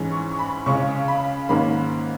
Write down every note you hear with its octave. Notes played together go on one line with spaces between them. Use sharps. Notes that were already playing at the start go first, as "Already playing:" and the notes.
Already playing: G#2 E3 G#3 C#4
C#6
C#6
B5
C#2 C#3 G#3 C#4 C#6
B5
G#2 D#3 A#3 C#4 B5